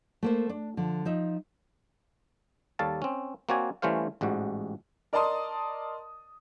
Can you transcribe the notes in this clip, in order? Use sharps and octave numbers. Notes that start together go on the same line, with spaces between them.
A3 A#3 C5
D4
D3 F3
F3 D#4 E5
D#2 G3 A4 C#5 F5 A5
C4 C#4
A#3 C4 F#4 C#5 D5 G#5
E3 G3 A3 C#4 C5 F5
A1 G#2 G3 F#4
A#4 D5 D#5 A5 C6 D#6